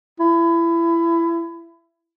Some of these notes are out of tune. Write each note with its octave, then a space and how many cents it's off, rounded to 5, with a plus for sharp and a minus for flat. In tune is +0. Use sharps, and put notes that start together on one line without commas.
E4 +25